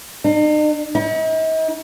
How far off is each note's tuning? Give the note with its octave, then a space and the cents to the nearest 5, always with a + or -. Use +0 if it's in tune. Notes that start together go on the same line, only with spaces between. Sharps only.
D#4 -45
D#4 +45